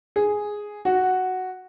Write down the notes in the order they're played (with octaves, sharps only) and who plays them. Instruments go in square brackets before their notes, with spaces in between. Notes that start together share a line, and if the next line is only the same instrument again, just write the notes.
[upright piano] G#4
F#4